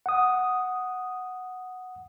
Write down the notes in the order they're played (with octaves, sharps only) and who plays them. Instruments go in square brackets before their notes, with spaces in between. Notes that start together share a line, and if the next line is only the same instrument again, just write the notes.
[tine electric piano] F#5 D#6